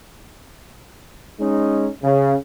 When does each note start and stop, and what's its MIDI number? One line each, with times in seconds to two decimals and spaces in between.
1.41 1.88 56
1.41 1.88 61
1.41 1.88 63
2.03 2.35 49